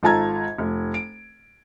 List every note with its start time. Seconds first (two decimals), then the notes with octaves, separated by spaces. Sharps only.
0.03 G#1 F4 A4 A5 A#5 G#6
0.58 F1
0.94 D7